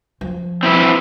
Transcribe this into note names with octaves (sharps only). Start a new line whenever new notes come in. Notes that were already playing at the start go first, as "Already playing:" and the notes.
F3
C4 E4 B4